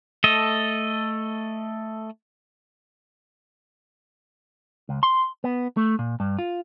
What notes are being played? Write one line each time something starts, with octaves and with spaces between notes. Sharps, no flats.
A3 A4 D#5
C#2
C6
B3
A3
A#2
G2
F4